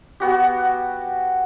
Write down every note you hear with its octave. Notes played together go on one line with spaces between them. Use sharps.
B3 F#4 G4